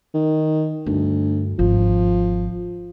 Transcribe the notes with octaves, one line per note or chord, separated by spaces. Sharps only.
D#3
D2 G2
G#1 F3